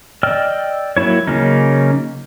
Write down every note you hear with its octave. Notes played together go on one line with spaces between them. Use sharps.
D5 D#5 G5 E6 F6
F#3 A#3 E4 C#5
C#3 F#3 A#3 C#4 D#4